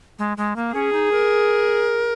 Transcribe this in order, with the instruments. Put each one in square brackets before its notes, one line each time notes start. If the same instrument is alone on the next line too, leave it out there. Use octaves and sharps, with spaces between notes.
[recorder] G#3
G#3
A#3
[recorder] C#4 [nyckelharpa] G#4
[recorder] D#4
A#4